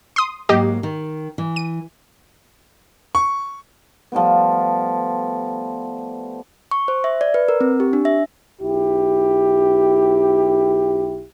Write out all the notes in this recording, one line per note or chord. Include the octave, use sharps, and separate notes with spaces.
C6 D#6
G#2 F#3 A#3 G4 D#5
D#3
E3
D#7
C#6
F3 G3 A3 B3
C#6
C5
E5
D5
B4
A#4
C4
G4
D4
E5
B1 E4 G4